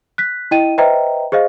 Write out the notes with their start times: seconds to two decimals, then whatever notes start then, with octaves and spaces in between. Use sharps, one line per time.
0.18 F#6 B6
0.51 E4 D#5 G5 D#7
0.78 B4 C5 D#5 E5 G5 A#5
1.32 G#4 C5 D#5 F5